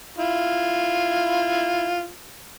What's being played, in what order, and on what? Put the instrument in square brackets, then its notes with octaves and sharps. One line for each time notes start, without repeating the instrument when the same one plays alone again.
[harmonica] E4 F4